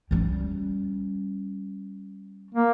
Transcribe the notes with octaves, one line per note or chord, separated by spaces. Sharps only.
G3 C#4
A#3